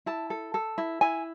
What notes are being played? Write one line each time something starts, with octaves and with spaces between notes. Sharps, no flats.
E4 A5
A4
A4
E4
E4 G#5